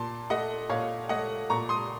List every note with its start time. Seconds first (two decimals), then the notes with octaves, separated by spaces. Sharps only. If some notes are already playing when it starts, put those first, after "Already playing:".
Already playing: A#2 A5 C6
0.30 A3 D#5 F#5
0.70 A#2 C#5 F5
1.09 A3 D#5 F#5
1.50 A#2 A#5 C#6
1.69 C6 D#6